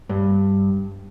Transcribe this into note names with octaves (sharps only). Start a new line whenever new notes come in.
G2